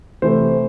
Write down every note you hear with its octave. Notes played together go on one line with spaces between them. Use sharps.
C3 E3 A3 C5